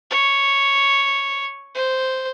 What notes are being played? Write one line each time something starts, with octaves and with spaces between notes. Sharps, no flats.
C#5
C5